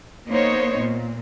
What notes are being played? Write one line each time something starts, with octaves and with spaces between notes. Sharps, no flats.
A#3 B3 D#4 C5 C#5
A#2